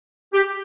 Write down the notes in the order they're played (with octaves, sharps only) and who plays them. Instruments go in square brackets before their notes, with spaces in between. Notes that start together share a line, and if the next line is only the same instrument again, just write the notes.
[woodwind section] G4